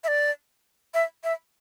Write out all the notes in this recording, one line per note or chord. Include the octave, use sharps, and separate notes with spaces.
E5
D5
E5
E5